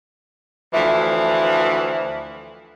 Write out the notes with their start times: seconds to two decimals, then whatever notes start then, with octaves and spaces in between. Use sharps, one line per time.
0.73 D2 E3 F3 E5